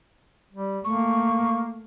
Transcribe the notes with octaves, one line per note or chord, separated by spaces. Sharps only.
G3
A3 A#3 C#6